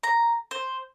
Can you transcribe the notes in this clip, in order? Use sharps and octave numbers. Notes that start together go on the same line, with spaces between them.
A#5
C5